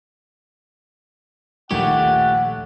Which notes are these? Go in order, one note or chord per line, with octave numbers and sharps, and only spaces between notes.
A#1 D#2 A#2 A3 G4 C#5 F#5